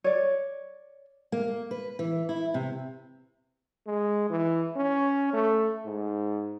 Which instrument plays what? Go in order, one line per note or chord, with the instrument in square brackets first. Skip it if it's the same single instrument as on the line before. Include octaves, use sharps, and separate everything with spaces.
[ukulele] C#5 D5
[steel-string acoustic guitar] A#3
B4
E3
E4
C3
[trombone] G#3
E3
C#4
A3
G#2